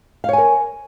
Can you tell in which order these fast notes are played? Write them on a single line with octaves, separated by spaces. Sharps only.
F5 C#5 G#5 A#4